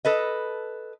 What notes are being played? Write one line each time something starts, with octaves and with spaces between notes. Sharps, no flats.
A4 B4 D#5